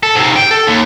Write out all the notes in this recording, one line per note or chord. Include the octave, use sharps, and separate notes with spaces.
A4
G#2 C3
G5
A4
D#2